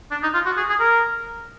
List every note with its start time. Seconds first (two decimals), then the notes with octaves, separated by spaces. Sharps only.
0.11 D4
0.23 D#4
0.34 F4
0.46 F#4
0.57 G#4
0.70 G#4
0.80 A#4